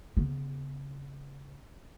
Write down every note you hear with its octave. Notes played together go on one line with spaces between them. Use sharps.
C#3 B3